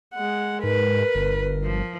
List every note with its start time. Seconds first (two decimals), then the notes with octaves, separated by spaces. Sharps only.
0.15 G#3 F#5
0.64 G#2 A#4 B4
1.15 G1
1.64 F3